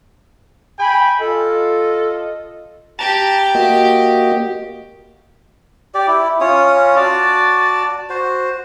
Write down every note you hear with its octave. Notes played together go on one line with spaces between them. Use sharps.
G5 G#5 B5
F4 A4 D#5
G4 A5 A#5 A6
A#3 F#4 D#5
G4 D5
E4
C#4 F4 C#5 D#6
F#4 D5 A5
F#4 C5